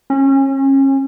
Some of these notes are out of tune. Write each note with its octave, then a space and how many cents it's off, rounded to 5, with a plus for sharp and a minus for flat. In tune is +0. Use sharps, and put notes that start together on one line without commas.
C#4 -30